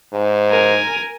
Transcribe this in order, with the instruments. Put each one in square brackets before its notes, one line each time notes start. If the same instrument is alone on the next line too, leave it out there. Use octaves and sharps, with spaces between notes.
[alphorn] G#2
[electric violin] A#4 G#5